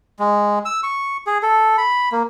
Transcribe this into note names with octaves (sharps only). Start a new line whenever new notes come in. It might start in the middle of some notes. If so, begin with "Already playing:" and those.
G#3
E6
C#6
G#4
A4
B5
A#3